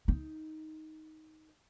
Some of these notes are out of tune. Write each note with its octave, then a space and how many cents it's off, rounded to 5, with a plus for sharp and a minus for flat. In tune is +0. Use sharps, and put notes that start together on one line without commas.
D#4 +10